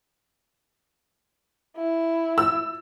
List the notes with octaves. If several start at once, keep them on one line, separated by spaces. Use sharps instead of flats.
E4
E6